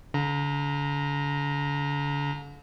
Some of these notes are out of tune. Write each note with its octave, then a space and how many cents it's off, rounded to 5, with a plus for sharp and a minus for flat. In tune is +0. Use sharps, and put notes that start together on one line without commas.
D3 -40 A#5 +0